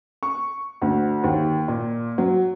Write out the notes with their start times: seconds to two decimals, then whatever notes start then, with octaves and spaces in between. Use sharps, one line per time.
0.23 C#6
0.82 D2
1.24 D#2
1.68 A#2
2.18 F#3